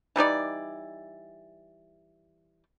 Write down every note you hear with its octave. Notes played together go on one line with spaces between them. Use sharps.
E3 G3 D#4 D5